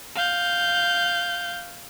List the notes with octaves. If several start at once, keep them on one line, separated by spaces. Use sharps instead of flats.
F5 G6